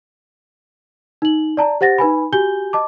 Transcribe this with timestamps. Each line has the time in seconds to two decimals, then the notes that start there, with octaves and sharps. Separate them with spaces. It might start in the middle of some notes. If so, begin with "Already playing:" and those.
1.22 D#4 F#7
1.57 D5 A5 A#5
1.81 G4 C5 F#5 A6 A#6
1.98 D#4 B4 G#5 B5
2.32 F#4 G4 G#5 G6 G7
2.73 D#5 A5 D6